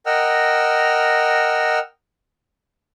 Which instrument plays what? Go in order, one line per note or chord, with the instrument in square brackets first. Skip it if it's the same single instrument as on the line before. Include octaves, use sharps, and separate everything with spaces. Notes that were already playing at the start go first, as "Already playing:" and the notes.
[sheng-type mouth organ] A#4 D#5 F#5 G5 E6 F6